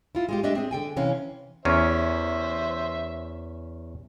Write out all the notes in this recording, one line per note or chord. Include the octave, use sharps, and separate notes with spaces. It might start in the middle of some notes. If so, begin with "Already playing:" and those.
E4 F4
G#3 F4 G4
A3 D4 G4 D#5 E5
C4 G#4
D3 G5 G#5
C3 E3 C#4 F5
E2 C#4 C5 E5